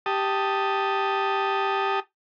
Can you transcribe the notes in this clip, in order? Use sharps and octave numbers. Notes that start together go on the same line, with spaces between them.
G4 A5 D#6